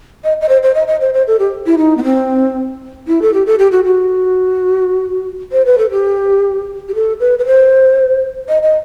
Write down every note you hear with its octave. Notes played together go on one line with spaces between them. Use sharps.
D#5
D#5
C5
C5
D#5
D#5
C5
C5
A4
G4
E4
D#4
B3
C4
E4
A4
G4
A4
G4
F#4
F#4
C5
B4
A4
G4
G4
A4
B4
B4
C5
D#5
D#5